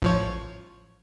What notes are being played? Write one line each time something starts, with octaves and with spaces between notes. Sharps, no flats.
A1 F3 C#5